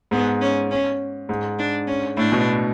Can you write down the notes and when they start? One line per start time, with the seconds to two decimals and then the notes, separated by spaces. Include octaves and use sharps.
0.11 G#2 B3
0.41 C#4
0.71 C#4
1.29 G#2
1.59 D4
1.87 C#4
2.17 A2 D4
2.32 B2